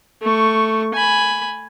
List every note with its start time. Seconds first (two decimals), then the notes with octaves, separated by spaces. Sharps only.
0.22 A3 C#6
0.94 G#5 B5